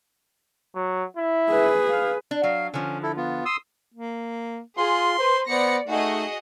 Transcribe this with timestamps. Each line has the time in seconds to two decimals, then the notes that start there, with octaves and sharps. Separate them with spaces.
0.75 F#3
1.17 E4
1.50 G#4 B4
1.89 F5
2.31 D4
2.43 F#3 F5
2.74 D3 F3 C#4
3.03 E4 A4
3.17 B3 F4
3.45 C6 D#6 E6
3.94 A#3
4.78 F4 G#4 C6
5.19 B4 C5
5.49 B3 C5 D5 A#6 C#7
5.88 A3 D#4 F#4 G#4 D#5